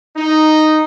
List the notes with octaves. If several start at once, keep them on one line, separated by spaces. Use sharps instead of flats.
D#4